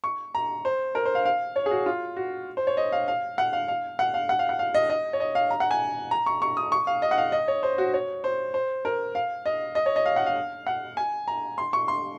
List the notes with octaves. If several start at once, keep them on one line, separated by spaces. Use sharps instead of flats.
C#6
A#5
C5
A#4
C5
F5
F5
C#5
G#4
F#4
F4
F#4
C5
C#5
D#5
F5
F5
F#5
F5
F5
F#5
F5
F#5
F5
F#5
F5
D#5
D#5
C#5
D#5
F5
A#5
F#5
G#5
A#5
C#6
C#6
D#6
C#6
F5
D#5
F#5
F5
D#5
C#5
C5
F#4
C#5
C5
C5
A#4
F5
D#5
D#5
C#5
D#5
F5
F#5
F5
F#5
G#5
A#5
C6
C#6
C6